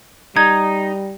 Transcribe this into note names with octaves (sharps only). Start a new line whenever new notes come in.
G3 D#4 G#6